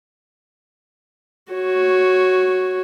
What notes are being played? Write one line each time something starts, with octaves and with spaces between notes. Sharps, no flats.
F#4 C#5